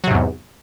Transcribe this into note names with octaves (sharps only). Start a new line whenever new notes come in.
E2 G#2 C3 F#3